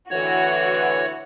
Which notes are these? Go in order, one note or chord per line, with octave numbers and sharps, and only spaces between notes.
A2 D3 E3 F#4 C#5